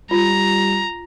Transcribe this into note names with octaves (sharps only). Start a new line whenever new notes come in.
G3 F4 A#5